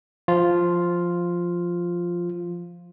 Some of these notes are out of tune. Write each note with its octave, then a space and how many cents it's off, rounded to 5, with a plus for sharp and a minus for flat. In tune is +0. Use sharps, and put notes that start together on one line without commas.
F3 +0 F4 +0